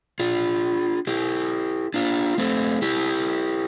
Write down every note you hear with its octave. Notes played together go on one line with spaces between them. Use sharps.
D4 F4
E4 G4
D4 F4
A3 C4
E4 G4